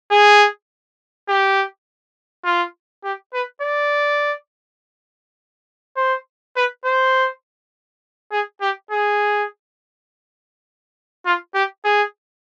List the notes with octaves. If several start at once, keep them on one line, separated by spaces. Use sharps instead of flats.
G#4
G4
F4
G4
B4
D5
C5
B4
C5
G#4
G4
G#4
F4
G4
G#4